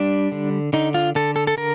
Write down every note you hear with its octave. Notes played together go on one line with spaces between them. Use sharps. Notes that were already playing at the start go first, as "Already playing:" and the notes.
Already playing: G3 D4
D3
D3 D#4
F4
D3 A4
A4
A4
D3 A#4